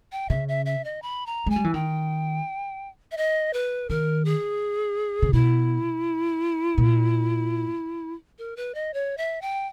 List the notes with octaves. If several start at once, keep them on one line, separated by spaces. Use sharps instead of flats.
G5
C#3 E5
E5
E5
D#5
B5
A#5
G#3 G#5
G3
E3
D#3 G5
E5
D#5
B4
D#3 A#4
G#4
C#3
B2 E4
A#2
A#4
B4
D#5
C#5
E5
G5